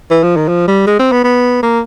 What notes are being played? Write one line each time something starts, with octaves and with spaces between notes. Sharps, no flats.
E3
F3
D#3
F3
G3
G#3
C4
B3
B3
A#3